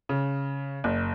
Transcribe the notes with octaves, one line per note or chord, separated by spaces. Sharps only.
C#3
F#1